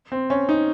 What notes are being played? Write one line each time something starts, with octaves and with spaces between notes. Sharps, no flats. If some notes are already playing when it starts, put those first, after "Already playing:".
C4
C#4
D#4